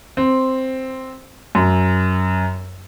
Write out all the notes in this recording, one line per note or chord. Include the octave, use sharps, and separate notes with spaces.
C4
F#2